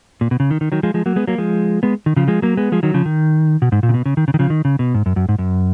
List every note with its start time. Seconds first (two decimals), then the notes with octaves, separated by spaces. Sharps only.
0.21 A#2
0.31 B2
0.40 C#3
0.51 D#3
0.61 D#3
0.72 D#3 F#3
0.83 F3 G#3
0.94 F3 G#3
1.06 F#3 A#3
1.16 G#3 B3
1.27 F#3 A#3
1.38 F3 G#3
1.83 G#3 B3
2.06 D#3
2.16 C#3 F3
2.28 F3 G#3
2.42 F#3 A#3
2.57 G#3 B3
2.72 F3 G#3
2.83 D#3 F#3
2.94 C#3 F3
3.06 D#3
3.62 B2
3.72 G#2
3.83 A#2
3.89 C#3
3.94 B2
4.06 C#3
4.17 D#3
4.28 C#3
4.34 D#3
4.39 C#3 F3
4.50 D#3
4.65 C#3
4.79 B2
4.94 G#2
5.06 F#2
5.16 F#2
5.29 G#2
5.39 F#2